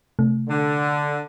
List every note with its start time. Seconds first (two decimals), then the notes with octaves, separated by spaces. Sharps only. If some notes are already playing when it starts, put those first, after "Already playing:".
0.19 C3 A3
0.49 D3